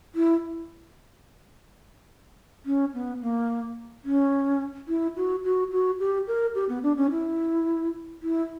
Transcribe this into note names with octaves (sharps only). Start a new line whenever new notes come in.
E4
C#4
B3
A#3
C#4
E4
F#4
F#4
F#4
G4
A#4
G4
B3
D4
C#4
E4
E4